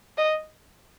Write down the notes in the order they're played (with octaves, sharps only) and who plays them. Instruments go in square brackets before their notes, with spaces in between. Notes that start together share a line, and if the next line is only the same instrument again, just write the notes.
[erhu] D#5